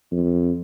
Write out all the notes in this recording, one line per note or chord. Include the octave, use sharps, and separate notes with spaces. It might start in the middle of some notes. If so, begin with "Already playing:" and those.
F2